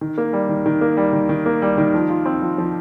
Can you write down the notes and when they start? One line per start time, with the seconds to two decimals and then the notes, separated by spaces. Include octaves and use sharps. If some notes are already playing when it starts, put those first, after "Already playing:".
0.01 D#3
0.18 A#3
0.33 G3
0.49 D#3
0.66 D#3
0.81 A#3
0.97 G3
1.13 D#3
1.29 D#3
1.46 A#3
1.62 G3
1.78 D#3
1.94 F3
2.09 F4
2.26 C4
2.42 F3
2.58 F3